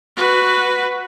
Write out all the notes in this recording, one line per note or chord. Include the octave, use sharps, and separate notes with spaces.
F#4 B4